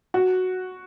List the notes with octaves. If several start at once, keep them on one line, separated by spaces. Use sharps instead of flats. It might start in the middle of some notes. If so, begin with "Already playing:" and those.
F#4